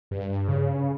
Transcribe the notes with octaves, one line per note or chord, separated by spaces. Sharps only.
G2
C#3